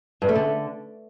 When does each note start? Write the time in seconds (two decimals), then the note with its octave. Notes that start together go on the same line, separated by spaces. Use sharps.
0.22 G2
0.29 A3
0.35 D3